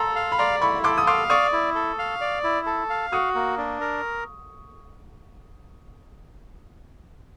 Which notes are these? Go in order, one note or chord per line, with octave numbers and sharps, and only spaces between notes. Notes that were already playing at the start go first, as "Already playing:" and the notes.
Already playing: A4 A#5 C6
F5
B5
D5 A#5 C6
E4 B5 C#6
A4 C6 D6
D#6
F5 C6 D6
D5 C#6 D#6
E4
A4
F5
D5
E4
A4
F5
F#4 C#6 D#6
A#3
D4
A#4